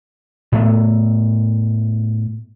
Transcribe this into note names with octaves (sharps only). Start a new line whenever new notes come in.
A2 A3 B3